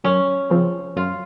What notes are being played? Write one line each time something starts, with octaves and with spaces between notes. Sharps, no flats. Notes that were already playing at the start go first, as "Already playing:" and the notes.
F#2 C#4
C#3 F3 C4 F4
F#2 F4